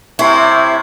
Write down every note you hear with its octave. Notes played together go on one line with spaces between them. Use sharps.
C3 E4 C#5 G#5 C6